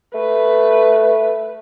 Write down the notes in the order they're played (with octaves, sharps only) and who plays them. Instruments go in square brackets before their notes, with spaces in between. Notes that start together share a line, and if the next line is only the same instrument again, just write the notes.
[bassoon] A3 [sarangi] B4